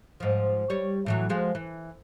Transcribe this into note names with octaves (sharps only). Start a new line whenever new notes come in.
G#2 F3
G3 C#5
A2 E3 F#3
F3 G#3 F#4
E3